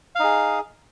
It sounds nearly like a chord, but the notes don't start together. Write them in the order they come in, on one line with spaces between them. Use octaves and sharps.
F5 D#4 G#4